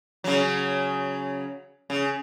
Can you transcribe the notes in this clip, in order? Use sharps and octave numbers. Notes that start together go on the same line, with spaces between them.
C#3 F#3
C#3